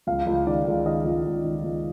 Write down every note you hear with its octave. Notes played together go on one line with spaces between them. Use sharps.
C#2 F5
C#2
D#3 D5
C#2
D#3 D#5
C#2
C#2
D#3
C#2